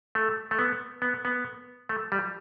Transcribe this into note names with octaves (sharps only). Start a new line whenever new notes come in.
A3
A3
B3
B3
B3
A3
G3